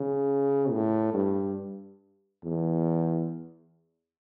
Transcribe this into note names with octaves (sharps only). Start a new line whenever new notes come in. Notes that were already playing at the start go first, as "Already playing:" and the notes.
Already playing: C#3
A2
G2
E2